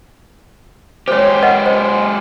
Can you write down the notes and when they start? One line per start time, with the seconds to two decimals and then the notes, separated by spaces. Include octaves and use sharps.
1.08 G#3 G4 C5 C#5
1.42 B4 D#5 F#5
1.66 C5